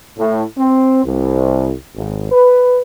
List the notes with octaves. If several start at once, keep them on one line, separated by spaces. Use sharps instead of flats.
A2
C4
C2
G#1
B4